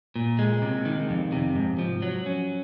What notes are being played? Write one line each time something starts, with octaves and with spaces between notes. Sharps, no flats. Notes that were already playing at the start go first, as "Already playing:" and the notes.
A#2
G#3
C3
D#3
F2
C3
G#2
F3
F#3
C#4